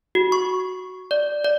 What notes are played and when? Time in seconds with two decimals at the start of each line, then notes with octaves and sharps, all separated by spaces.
0.15 F#4
0.32 C#6
1.11 D5
1.45 D5